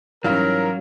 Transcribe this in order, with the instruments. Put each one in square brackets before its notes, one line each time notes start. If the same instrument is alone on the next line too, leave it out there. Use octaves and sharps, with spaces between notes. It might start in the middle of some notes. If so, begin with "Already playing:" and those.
[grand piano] G#2 E3 G3 [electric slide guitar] F#3 [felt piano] C#4 F5 [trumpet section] A#4